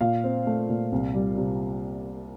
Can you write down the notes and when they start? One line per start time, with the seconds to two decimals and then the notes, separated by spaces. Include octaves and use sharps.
0.01 A#2 F5
0.24 C4
0.47 A3
0.69 A#2
0.92 C2
1.14 G3
1.38 C3